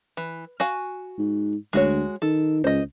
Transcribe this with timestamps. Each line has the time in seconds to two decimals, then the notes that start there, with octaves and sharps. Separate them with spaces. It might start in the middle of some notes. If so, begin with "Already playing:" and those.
0.17 E3
0.60 F#4 F5 G#5
1.18 G#2
1.73 D2 G#3 F#4 C#5
2.22 D#3 A4
2.64 C#2 C5 D#5